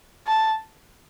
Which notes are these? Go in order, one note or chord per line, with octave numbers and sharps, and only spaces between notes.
A5